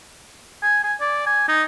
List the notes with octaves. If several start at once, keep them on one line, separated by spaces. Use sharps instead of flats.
G#5
G#5
D5
G#5
D#4